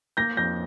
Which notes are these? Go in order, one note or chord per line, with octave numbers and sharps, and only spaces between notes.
A#3 G6 A#6
F2 G6 A#6